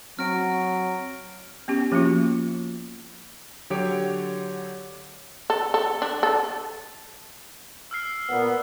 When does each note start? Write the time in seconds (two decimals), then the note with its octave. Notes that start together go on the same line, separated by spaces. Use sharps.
0.19 F#3 C4 F#5 F6 A#6 D7
1.68 B3 C#4 G4
1.92 F3 A#3 C#4 F4 F#4
3.70 D3 F#3 G4 C#5 D6 D7
5.50 A4
5.74 A4
6.02 D4
6.23 A4
7.91 E6 F6 C7
8.29 A#2 B3